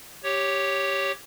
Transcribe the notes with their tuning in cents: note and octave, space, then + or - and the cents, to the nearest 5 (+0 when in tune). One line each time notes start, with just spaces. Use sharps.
G4 +0 C#5 +0